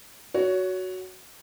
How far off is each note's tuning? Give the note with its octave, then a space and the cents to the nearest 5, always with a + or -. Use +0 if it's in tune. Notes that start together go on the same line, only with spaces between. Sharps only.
F#4 +0 C#5 +20